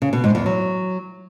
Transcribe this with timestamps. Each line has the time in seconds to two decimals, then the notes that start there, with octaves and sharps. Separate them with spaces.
0.02 C#3
0.13 B2
0.24 G#2
0.35 E2
0.46 F#3